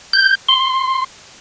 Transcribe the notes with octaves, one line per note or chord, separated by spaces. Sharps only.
G6
C6